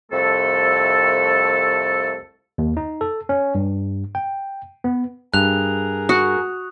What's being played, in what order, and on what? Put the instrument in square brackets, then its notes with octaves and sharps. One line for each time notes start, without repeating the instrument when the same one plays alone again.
[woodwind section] C2 F2 A3 A4
[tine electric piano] D#2
D#4
A4
C#4
G2
G5
B3
[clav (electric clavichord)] G2 [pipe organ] G#4 A#4 [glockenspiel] F#6 F7
[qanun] F#4 [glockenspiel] D#6 F#6